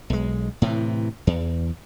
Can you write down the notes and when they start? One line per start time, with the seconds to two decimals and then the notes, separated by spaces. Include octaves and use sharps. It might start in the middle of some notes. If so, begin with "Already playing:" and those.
0.10 B1 G#3
0.62 A2 C3 E3
1.27 E2